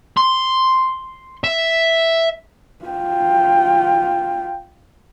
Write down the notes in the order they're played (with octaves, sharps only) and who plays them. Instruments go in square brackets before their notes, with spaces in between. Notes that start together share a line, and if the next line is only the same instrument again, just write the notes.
[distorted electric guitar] C6
E5
[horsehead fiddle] F4 G5